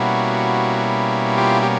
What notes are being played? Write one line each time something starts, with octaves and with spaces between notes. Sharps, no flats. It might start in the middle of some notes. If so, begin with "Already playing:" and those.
Already playing: B2 G3 A#3 C#4 E4 F#4
F4 G4
G4